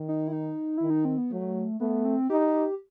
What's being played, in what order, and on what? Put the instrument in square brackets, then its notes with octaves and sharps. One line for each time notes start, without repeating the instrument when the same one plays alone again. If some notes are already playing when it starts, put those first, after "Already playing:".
Already playing: [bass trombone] D#3
[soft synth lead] D#4
E4
D#4
[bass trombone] D#3 [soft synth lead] E4
[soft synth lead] D#4
C4
B3
[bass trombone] F#3 [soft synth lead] A3
[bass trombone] A3 [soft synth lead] B3
[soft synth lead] C4
[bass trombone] D#4 [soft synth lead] G4